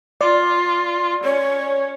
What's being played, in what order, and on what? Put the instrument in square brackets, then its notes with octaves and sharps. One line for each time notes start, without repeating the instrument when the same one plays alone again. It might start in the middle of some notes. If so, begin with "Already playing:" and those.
[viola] F4 [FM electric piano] D5
[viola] C#4 [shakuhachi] C#5